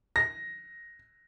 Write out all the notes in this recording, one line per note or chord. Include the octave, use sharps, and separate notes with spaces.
A#6